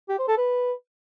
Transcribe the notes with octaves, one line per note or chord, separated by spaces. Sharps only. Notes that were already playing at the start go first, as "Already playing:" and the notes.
G4
C5
A4
B4